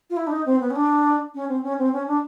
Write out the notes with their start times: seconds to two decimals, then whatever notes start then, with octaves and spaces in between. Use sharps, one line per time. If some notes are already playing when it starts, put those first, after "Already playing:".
0.10 F4
0.17 E4
0.27 D4
0.32 D#4
0.46 C4
0.61 B3
0.70 C#4
0.76 D4
1.35 C#4
1.49 C4
1.63 C#4
1.79 C4
1.93 C#4
2.08 D4